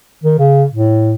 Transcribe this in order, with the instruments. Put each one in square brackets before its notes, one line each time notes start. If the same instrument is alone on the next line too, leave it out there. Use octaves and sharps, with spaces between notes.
[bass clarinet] D#3
C#3
A2